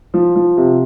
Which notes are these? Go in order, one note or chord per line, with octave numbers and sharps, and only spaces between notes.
F3
F3
C3